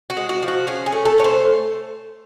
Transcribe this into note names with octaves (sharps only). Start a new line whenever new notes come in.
F#4
G#3
F#4
F3
F#4
C#4 G#4
G#4
A3
A4
A3 C#5
C5